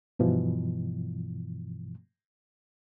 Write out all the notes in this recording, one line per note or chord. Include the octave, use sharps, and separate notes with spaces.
G2 B2 E3 F3